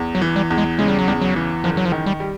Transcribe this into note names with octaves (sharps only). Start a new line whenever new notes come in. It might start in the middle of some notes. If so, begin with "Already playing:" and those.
Already playing: E2
F#3
E3
G3
E2
G#3
C#3 G#3
G3
F#3
E2 G3
F#3
E3
F#1 F3
F#3
F3
D#3
G3
G3